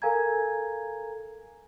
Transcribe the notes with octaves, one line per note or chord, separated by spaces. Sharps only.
A4 A#4 F5 G#5 A#5 G#6